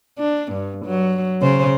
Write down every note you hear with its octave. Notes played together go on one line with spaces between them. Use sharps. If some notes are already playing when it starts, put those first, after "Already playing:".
D4
G2
F#3
C#3 C5